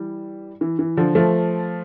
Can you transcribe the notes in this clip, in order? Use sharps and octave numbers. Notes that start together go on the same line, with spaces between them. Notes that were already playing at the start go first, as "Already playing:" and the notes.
Already playing: E3 G3
E3
E3
D3 F3
F3 A3